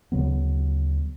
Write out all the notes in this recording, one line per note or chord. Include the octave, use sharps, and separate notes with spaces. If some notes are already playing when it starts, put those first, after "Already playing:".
D2 C#3 F#3 B3